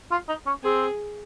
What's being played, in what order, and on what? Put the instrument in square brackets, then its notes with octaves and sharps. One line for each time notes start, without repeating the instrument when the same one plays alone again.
[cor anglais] F4
D#4
C#4
[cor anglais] C4 [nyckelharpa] G#4